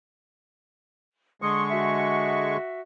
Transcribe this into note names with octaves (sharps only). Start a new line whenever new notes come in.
D3 G#3 C6 C#6 D#6
F#4 E5